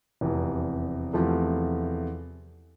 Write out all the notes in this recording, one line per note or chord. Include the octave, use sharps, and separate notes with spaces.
F1 E2 C3
E2 C3 F3 A3